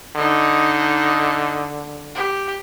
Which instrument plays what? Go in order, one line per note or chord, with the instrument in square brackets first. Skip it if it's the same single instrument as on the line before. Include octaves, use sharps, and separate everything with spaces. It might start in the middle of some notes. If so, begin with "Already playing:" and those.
[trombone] D3 [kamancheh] D#4 D#5
[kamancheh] G4